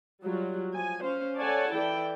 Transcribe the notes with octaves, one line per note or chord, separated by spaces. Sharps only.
F#3 G3 F4 F#4
F3 G#5
C#4 C5 F5
A4 C#5 D5 F#5 G#5 A5
E3 E4 A4 D5 G5